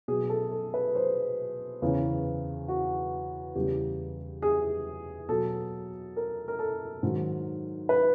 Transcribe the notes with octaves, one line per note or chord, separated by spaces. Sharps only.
B2 F#3 G#4
A4
A4
B4
C5
E2 C#3 E3
F#4
E2 C#3 E3 G3 G4
G#4
B2 F#3 A4
A#4
A#4
A4
G#2 D#3 F#3
B4